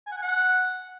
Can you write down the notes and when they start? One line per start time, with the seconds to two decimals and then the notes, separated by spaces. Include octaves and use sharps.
0.07 G#5
0.12 F#5
0.17 G#5
0.22 F#5